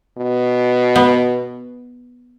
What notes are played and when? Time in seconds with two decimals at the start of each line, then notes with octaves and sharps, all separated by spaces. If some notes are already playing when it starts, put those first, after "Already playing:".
0.18 B2
0.96 B3